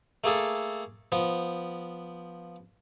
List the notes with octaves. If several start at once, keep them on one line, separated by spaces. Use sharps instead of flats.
A3 A#3 G#4 A4
F3 B3